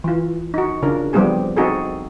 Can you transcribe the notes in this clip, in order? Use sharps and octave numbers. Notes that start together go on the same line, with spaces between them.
E3 F4
D#4 F#4
C#3 D4 F4 A#4
F3 G3 B3 C4 G4 G#4
C4 D#4 F#4 G#4 A4